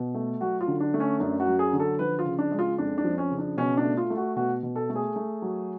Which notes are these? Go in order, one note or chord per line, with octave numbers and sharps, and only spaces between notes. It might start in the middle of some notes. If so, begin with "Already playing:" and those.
Already playing: B2
A3
F#3 F#4
F4
D3
D4
A3
C#4
F#2 D4
F#4
F#3
G#4
D3
A4
F3 B4
F4
C#3
D4
G#3
F4
F2 D4
D4
F3
C#4
C#3
D4
B2 C#4
D4
A3
F4
A3
F#4
B2 F#4
B2
A4
A3
G#4
A3
F#3